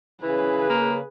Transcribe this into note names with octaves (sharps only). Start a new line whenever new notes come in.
C#3 E3 G#4 B4
A#3